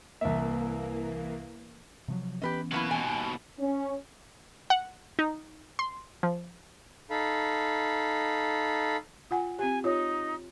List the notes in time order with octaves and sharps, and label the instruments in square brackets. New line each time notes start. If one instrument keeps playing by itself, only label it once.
[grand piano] C2 E5 [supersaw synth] E3 A#3
[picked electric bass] C3 F3 F#3
[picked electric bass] E3 B3 C#4 [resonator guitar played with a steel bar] G4 B4 D#5
[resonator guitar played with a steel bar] F#3 A#3 E4 [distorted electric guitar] F#4 B4
[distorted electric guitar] D#2 B2 [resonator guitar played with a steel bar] G#3 G#5
[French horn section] C#4
[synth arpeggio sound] F#5
D#4
C6
F3
[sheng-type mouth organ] D#4 A4 F5 B5
[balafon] F4 F#5 G#5
[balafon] C4 G4 [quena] G#5
[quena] D#4 [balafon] F4 C#5